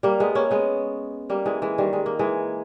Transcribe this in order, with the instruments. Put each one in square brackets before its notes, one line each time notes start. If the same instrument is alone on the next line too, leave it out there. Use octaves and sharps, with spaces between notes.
[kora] G3 A#3
G#3 B3
A#3 C#4
G#3 B3
G3 A#3
E3 G#3
E3 G#3
D#3 G3
G#3
A#3
E3 G#3